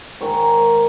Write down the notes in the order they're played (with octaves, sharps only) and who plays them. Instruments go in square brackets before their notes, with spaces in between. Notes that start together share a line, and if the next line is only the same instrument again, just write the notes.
[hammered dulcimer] G#2 D#3 G#3 C#5